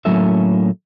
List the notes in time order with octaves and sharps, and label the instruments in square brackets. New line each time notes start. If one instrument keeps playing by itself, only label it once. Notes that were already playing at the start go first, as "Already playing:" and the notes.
[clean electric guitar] A2 F#3 A#3 C#4 A4 E5